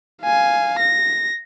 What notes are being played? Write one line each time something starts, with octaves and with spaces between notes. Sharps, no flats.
F5 G#5
A#6